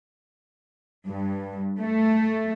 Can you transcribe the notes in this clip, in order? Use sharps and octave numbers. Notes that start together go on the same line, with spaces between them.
G2
A3